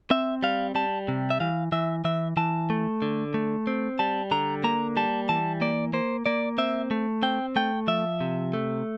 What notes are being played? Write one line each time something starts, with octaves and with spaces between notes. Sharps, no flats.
C4 E5
G3 F5
G3 A5
C3
E5
E3 F5
E3 E5
E3 E5
E3 A5
A3
D3
A3
C4
G3 A5
D3 A#5
A#3 A#5
G3 A5
E3 A5
A#3 D5
A#3 C5
A#3 D5
C4 E5
A3
C4 G5
A3 G5
F3 E5
C3
A3